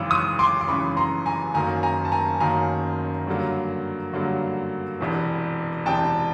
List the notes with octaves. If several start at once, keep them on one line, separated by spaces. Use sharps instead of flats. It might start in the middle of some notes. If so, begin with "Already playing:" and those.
Already playing: G#1 F#2 C#3 E3 D6 E6
C#6 D#6
C6 D6
D6
G#1 F#2 C#3 E3 B5 C#6
A#5 C6
G#5 A#5
F#1 F#2 D#3 F#3 A#3 G#5 A#5
G#5 A#5
A5
G#5 A#5
F#1 F#2 D#3 F#3 A#3 G#5 A#5
G2 D3 F#3 A#3
G2 D3 F#3 A#3
E1 E2 C3 E3
E1 E2 C3 E3 G5 A5